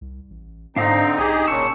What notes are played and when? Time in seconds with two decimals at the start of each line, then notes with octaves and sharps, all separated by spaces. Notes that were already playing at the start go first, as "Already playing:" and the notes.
0.01 C2
0.30 A1
0.76 G#2 D3 C4 D4 D#4 F5 A#5
1.18 B1 D#4 G4 G#4
1.48 E1 A#2 C#3 A5 C#6 E6